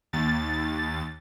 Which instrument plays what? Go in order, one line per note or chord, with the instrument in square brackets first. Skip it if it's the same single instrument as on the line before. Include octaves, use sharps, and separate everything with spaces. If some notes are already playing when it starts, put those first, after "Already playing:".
[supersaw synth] D#2 A6